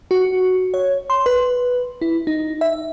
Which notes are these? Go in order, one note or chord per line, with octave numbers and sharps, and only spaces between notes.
F#4
C#5
C6
B4
E4
D#4
E5